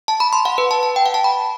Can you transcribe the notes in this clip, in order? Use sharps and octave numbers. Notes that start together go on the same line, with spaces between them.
A5
B5
C6
F#5
B4
A5
A5
G5
F#5
A5
B5